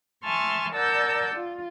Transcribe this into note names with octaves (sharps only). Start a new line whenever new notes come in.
E5 G#5 A5 C6 C#6 F6
A#4 D5 F#5 A5 E6 G6
F4